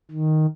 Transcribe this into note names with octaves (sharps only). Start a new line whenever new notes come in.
D#3